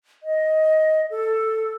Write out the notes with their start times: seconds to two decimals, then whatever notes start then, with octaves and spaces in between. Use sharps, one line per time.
0.23 D#5
1.11 A4